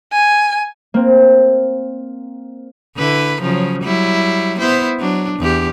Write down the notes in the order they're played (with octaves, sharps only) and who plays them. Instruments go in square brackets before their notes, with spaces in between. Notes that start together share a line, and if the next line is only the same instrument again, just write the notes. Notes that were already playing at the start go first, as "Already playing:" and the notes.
[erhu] G#5
[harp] A#3 C4
[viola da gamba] D3 E4 B4
C#3 F3 F#3
F#3 G3 E4
B3 E4 C5
F#3 D4
E2 G4